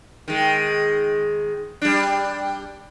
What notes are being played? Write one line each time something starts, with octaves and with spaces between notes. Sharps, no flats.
D#3 G#3
G3 D4